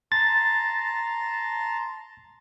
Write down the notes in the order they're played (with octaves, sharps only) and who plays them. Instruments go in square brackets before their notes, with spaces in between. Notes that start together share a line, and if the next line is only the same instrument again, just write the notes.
[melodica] A5 A#5 C6 [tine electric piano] A6